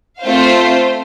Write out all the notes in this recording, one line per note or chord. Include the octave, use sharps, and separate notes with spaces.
A3 C4 F4 C5 F5